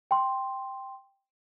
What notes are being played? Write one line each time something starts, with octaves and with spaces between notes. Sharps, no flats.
G5 C6